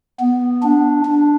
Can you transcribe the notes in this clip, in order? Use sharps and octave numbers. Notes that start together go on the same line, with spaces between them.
B3
D4
D4